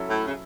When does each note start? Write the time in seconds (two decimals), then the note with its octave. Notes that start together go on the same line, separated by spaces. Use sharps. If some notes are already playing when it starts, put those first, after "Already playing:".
Already playing: F#3 C#4 E4 A4
0.09 A2
0.26 C#3